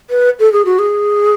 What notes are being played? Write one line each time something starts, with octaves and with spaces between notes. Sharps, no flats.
B4
A4
G#4
F#4
G#4